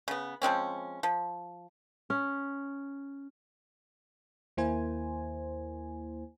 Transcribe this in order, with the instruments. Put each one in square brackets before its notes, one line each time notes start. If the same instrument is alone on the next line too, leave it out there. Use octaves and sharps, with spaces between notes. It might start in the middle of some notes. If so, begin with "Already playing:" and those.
[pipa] C#3 B3
F3 G#3 C4 C#4
F3
[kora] C#4
[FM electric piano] D#2 A#3 E4 C5 G#5